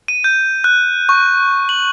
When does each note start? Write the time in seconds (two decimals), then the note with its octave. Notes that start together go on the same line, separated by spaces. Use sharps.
0.08 D#7
0.24 G6
0.64 F#6
1.09 C#6
1.69 F#7